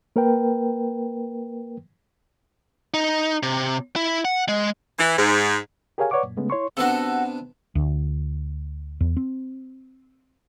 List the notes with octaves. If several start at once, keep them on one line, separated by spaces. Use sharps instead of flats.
A#3 A#4 B4 G5
D#4
C3
E4
F#5
G#3
E3
G#2
G4 G#4 A#4 C#5 F5 G#5
B4 C#5 D5 F#5 C#6 D6
F#2 A#2
C#3 G#3 A3 B3 C#4
E4 C#5 C6 C#6
C3 B3 D4 F#4 A4
D2
E2
C4